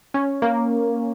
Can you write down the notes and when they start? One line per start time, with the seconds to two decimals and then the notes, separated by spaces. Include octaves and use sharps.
0.14 C#4
0.42 A#3